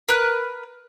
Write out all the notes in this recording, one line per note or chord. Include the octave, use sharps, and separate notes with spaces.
A#4 B4 F#6